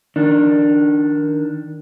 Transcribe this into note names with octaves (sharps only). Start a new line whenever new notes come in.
D#3 D4